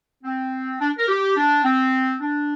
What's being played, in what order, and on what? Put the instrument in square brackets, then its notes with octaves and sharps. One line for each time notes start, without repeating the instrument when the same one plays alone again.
[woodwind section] C4
D4
A#4
G4
D4
C4
D4